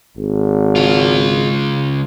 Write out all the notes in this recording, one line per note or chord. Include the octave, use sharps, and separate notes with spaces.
G#1
C#2 F4